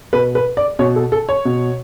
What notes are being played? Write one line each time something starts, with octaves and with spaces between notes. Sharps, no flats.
B2 B4
B4
D5
B2 C#5
A4
A4
C#5
B2